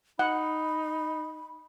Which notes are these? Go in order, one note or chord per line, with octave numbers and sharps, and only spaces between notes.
D#4 F#5 B5